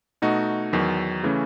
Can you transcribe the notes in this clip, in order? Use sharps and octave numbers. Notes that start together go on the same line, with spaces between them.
B2 A3 D#4 F#4
E2 D#3 F#3
C#3 E3 A3 C#4